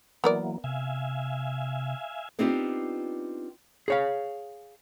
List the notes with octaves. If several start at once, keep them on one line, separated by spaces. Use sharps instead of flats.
E3 F#3 A#3 B3 A#4 D5
C3 E5 F5 G#5
B3 C4 D4 D#4 F4 G4
G#4 C#5 F5